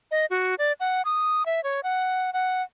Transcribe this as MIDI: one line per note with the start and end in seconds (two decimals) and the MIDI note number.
0.11 0.26 75
0.30 0.55 66
0.58 0.73 74
0.80 1.02 78
1.05 1.46 87
1.46 1.63 76
1.64 1.80 73
1.83 2.33 78
2.33 2.63 78